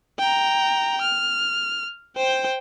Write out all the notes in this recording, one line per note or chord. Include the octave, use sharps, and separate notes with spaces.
G5 A#5
F6
C5 G5